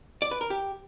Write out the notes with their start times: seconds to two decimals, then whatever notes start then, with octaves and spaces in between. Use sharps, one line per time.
0.22 D5
0.31 B4
0.41 A#4
0.50 G4